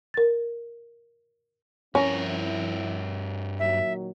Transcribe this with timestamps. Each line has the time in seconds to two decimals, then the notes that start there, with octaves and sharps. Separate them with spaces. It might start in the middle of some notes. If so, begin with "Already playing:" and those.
0.14 A#4 A6
1.95 G2 F3 C4 C#4 E4 A#4
3.59 A#2 D#3 F#3 E5